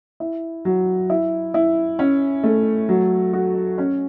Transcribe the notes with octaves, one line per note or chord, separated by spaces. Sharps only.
E4
F#3
E4
E4
C#4
A3
F#3
F#4
C#4